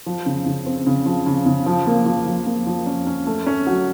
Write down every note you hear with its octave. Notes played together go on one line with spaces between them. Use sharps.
F3
C#3
C#3
C4
C#3
F3
C#3
C#3
F3
A#3
F3
F3
A#3
F3
C#4
C#4
A3
C#4
F#3